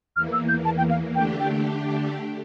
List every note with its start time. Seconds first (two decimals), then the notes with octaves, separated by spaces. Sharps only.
0.15 E2 E3 A#3 F6
0.33 E6
0.49 G6
0.65 A5
0.78 G5
0.90 F5
1.14 D3 A3 D4 G4 G5
1.40 G5